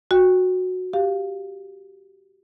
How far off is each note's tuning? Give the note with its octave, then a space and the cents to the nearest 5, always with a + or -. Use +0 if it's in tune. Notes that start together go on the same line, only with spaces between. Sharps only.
F#4 -10 G5 +25
G4 +0 F5 +0